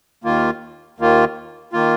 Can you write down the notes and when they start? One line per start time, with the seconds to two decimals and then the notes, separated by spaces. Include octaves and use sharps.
0.24 D#2 D#3 A#3 F4
0.98 D#2 D#3 A#3 F4
1.73 D#3 A#3 F4